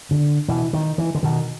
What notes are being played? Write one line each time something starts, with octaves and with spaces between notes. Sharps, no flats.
D3
B2 E3
D#3
E3
D3
B2 D#3